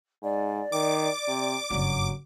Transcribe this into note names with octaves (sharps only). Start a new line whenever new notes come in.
G#2 D5
D#3 D6
C3
F#1 G2 F#3